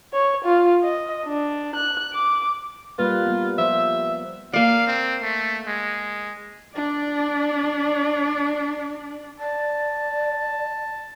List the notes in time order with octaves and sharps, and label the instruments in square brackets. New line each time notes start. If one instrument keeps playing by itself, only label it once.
[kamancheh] C#5
F4
D#5
D4
F#6
D6
[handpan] G3 A#3 B4 [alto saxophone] F4
[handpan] G3 B3
[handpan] F3 C5 [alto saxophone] E5
[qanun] A#3 D5 [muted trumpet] F5
[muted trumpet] C4
A3
G#3
[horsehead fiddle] D4 D5
[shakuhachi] D5 [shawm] A5